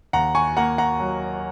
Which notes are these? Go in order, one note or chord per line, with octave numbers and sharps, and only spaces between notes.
D#2 F#5 A#5
G#5 C#6
A#3 F#5 A#5
F#5 A#5
F#3